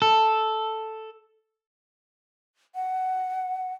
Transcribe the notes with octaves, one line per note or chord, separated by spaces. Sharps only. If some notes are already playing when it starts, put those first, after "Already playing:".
A4
F#5